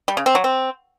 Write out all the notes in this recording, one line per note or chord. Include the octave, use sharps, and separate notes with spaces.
G3
C#3
C4
F#3
C4